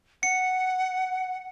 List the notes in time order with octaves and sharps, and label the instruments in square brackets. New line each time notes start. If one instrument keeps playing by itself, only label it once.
[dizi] F#5 [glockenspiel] C#7